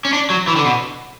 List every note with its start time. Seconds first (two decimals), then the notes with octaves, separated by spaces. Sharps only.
0.05 C#4
0.13 D4
0.30 F#3
0.47 E3
0.56 D3
0.65 B2